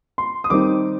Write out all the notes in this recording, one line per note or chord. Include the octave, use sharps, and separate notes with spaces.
C6
D#6
D#3 G3 C4 D#4 D6